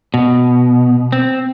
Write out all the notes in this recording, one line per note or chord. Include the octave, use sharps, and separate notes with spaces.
B2
C4